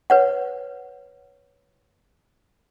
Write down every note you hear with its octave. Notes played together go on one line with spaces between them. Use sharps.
B4 C#5 F#5